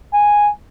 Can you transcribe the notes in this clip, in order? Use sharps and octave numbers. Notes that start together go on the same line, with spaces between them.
G#5